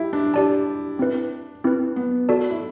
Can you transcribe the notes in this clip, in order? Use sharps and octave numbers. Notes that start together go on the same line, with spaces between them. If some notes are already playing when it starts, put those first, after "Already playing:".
Already playing: E4 G4
D4
G4 D5 A5
C4 E4 B4
C4 E4 B4
B3
F#4 A4 D5 A5
E4